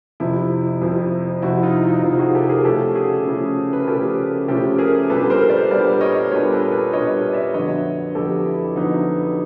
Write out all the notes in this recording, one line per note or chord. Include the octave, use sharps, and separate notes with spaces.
F2 C3 F3 E4
F2 C3 F3
F2 C3 F3 E4 F#4
D#4 F4
D#4
F2 C3 F3 D#4 F4
F#4 G#4
G4 A4
G#4 A#4
C#3 F3 A3 C#4 G4 A4
F#4 G#4
C#3 F3 A3 C#4
B4
A#4
C#3 F3 A3 C#4 G4 A4
C#3 F3 A3 C#4 G4 A4
G#4 A#4
A#2 G3 B3 D4 A4 B4
A#4 C5
C5 D5
A#2 G3 B3 D4 C5 D5
C#5 D#5
A#2 G3 B3 D4 B4 C#5
A4 B4
A4 B4
A#2 G3 B3 D4 C#5 D#5
D5 E5
F2 D3 F#3 B3 C#5 D#5
F2 D3 F#3 B3 G4 A4
E4
F2 D3 F#3 B3 D#4